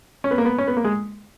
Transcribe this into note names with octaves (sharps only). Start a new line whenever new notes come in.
C#4
B3
A#3
B3
C#4
B3
A#3
G#3